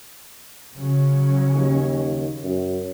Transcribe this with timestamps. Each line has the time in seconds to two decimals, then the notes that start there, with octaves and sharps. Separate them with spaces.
0.76 C#3 F#3 C#4
1.55 D#2
2.43 F#2